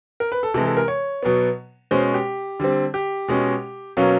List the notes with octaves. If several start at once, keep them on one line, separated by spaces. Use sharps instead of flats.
A#4
B4
A4
C3 E3 G#3 A4
A4
A#4
C#5
B2 F#3 B3
B2 G#3 C#4 C5
G4
D3 G3 C4
G4
B2 G#3 C#4
B2 F#3 A#3 C#4